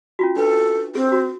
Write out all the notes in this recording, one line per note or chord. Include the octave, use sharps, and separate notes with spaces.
C#4 F4 F#4
D4 A4 B4
C4 G#4
F#4